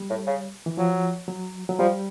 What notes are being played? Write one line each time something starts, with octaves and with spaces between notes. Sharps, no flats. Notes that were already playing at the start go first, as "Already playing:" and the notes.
Already playing: G3
A2
C#3
E3
F3 F#3
F#3
F#3
F3 G3